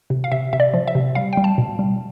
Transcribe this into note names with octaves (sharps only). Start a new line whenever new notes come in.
C3
F5
C3 E5
C3 E5
D5
F3
E5
C3
G3 F5
G3 G5
A5
B2
G3